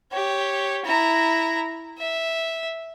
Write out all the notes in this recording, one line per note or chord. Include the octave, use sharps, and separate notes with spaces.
G4 C#5
E4 A#5
E5